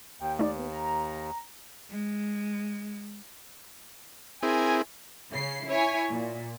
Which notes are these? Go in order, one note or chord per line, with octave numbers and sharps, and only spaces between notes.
D#2 G5
A3 D#4 D5
B3
A#5
G#3
C4 E4 G#4 A#4 G#5
C#3 C7
E4 C#5 G#5
A#2